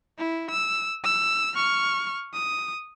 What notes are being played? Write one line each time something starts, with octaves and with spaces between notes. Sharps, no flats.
E4
E6
E6
C#6 F6
D#6